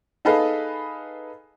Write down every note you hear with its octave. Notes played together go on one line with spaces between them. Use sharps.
D#4 G#4 A4 B4 D#5 F5